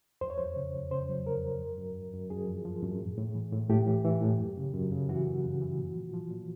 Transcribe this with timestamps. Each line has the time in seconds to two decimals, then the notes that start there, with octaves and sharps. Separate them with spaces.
0.21 F2 C5
0.30 C#5
0.38 F2 C5
0.56 C#3
0.74 F2
0.91 C#3 C5
1.09 F#3
1.26 F2 A#4
1.43 F2
1.61 F#2
1.78 F#2
1.96 F#2
2.13 F#2
2.30 F#2 G#4
2.48 F3
2.65 F3
2.83 F#2
3.01 A2
3.17 A2
3.35 E3
3.52 A2
3.70 A2 G4
3.87 E3
4.05 E3
4.22 A2
4.39 F#2
4.57 C#3
4.74 F#2
4.92 C#3
5.09 E3 F#4
5.26 F#2
5.44 C#3
5.61 E3
5.78 A#2
5.96 F3
6.13 F3
6.31 A#2